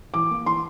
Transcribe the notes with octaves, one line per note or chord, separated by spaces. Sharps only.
E3 D6
A#3
E3 C6